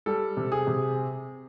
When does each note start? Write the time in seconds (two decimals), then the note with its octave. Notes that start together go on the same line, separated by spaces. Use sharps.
0.06 G3 A4
0.37 C3
0.52 G#4
0.67 C3